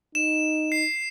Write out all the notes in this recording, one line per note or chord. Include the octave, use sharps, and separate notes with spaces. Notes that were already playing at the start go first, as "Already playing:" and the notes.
D#4 E7
C7